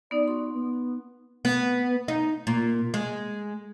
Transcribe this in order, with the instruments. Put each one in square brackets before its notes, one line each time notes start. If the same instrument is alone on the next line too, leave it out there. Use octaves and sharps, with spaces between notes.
[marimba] B3 D#4 [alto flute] D5
[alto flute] F#4 [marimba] C6
[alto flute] B3
[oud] B3
D#4
A#2
G#3